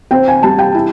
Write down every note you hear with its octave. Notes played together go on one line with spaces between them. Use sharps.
C4 G5
G#5
G3 A5
G5
E4